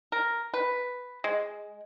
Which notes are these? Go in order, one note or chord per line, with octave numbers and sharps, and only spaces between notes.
A#4
B4
G#3